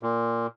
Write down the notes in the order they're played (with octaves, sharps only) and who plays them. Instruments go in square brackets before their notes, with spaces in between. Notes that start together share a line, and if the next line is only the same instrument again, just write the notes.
[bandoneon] A#2